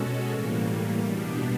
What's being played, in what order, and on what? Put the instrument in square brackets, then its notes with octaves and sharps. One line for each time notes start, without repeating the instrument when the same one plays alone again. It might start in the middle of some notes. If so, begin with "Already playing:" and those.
Already playing: [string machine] B2 G#3 C#4 F#4 A4
A2 E3 G3 A#3
E2 B2 G3 B3 D4